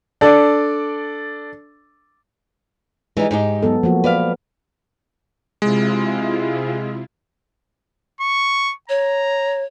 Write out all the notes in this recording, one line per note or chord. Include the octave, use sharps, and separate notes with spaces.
D4 A4 D5
E3 G3 G#3 D#4
G#2 D#4 G4
F#3 B3 A4
F3 A#3 F#4
B4 D5 F5
C3 G#3 E4 F4
C#6
C#5 A#5